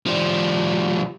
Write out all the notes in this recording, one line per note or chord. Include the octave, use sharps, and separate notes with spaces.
F3 G3